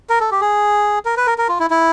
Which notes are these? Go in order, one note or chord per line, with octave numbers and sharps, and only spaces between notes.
A#4
A4
G4
G#4
A#4
B4
A#4
A#4
F4
E4
E4